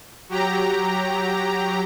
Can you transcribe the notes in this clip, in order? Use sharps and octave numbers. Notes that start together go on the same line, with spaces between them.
F#3 G4 A#5